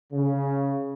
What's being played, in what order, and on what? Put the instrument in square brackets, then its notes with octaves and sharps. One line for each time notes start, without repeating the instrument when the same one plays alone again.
[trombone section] C#3